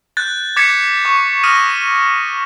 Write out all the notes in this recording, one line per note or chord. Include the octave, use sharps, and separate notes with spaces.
F#6 G6 A6
D6 G#6 A6 B6 C#7 E7
C#6 D6
D#6 F6 A#6 D#7 E7